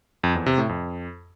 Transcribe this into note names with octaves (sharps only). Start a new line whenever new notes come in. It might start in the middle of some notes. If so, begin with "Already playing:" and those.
F2
E2
C3
A2
F2